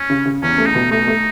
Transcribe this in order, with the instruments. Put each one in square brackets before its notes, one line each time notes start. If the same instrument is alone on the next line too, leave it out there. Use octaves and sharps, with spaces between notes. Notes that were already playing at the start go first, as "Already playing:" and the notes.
Already playing: [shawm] C#4
[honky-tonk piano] C#3
C#3
[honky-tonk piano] E2 [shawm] C#4
[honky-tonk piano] A3
[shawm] D#4
[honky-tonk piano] B2
[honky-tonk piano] A3 [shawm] D#4
[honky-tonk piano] A3